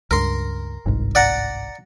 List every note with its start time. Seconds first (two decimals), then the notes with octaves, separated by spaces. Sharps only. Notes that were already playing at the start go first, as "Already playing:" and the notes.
0.11 C#2 G2 A#4 C6
0.86 G1 C2 G#2
1.15 D5 F#5 A#5